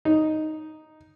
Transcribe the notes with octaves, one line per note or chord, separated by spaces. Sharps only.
D#4